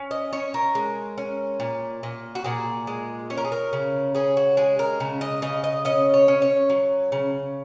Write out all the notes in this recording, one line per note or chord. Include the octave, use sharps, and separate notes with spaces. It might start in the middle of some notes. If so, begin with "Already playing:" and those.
Already playing: C#4
D#5
C#4 C#5
A#4
G#3
C#4
A#2
A#2
F#4
A#2 G#4
G#3
C#4 C#5
A#4
G#4
A#4
C#3
C#4 G#4
F#4
G#3 G#4
A#4
C#3
D#5
C#3 D#5
D#5
C#4 D#5
C#5
C#4
C#5
F#3
C#3